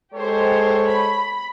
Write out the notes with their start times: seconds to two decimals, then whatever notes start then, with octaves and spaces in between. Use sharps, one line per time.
0.14 G#3 G4 A4 C5 C#5
0.87 B5